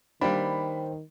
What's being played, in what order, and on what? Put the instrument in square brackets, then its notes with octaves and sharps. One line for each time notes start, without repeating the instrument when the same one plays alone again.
[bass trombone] D#3 [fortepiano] G3 A#3 D4 [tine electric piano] C5 G5 [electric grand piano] B5